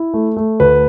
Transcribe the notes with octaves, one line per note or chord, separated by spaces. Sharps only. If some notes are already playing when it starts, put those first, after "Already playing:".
Already playing: E4
A3
A3
D2 B4